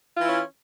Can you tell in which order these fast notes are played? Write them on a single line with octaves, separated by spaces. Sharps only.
F4 E3 E4 C#4